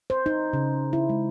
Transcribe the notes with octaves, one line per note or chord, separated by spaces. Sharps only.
C5
D#4
C#3
E4
G#3